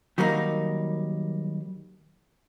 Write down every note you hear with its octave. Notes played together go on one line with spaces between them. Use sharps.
D#3 F#3 G3 A#3 C#4 D#4